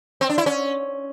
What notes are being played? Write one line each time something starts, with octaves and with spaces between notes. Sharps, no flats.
C4
D4
E4
C#4